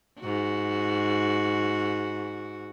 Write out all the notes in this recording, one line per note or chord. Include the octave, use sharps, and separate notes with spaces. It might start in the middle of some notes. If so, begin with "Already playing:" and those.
G#2 F#4